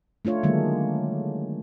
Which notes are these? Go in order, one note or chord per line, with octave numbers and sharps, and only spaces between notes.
A3 D4 F4 C#5
D3 D#3 F#3 G#3 A#3